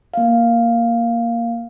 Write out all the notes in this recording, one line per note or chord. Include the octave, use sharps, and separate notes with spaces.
A#3 F5